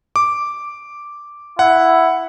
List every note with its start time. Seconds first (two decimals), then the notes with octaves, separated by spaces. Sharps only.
0.16 D6
1.59 E4 F#5